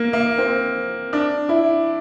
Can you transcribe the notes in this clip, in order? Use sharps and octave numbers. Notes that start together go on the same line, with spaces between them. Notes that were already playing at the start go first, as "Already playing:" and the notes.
Already playing: A#3
A#3
C4
D4
E4